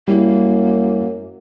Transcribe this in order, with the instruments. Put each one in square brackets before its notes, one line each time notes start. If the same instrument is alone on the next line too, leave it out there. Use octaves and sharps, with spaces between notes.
[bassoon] F#2 [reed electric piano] G3 E4 [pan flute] A#3